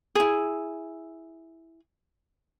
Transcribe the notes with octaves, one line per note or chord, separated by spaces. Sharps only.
E4 G#4